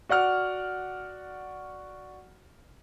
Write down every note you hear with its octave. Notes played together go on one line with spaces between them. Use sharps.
F#4 D5 F#5 F6